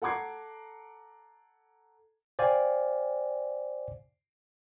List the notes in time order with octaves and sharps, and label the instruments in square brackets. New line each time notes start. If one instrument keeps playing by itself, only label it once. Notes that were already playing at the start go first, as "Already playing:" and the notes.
[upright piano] A4 F#5 A#5 D6 G#6 C7
[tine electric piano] C5 D5 F5 G5 G#5